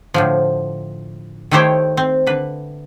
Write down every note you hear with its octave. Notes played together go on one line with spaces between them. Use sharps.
A2 D3 F3
D#3 A3 E4 G4 C5 C#5
C4
D3 B4